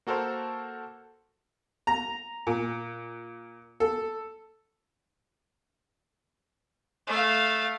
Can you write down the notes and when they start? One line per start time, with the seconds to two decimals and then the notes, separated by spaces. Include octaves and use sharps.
0.07 A#3 F#4 A4 A#4 C5
1.87 A#5
2.47 A#2
3.80 A4
7.08 A3 F5